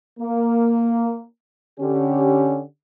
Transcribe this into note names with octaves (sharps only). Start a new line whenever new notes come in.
A#3
D3 C#4 G4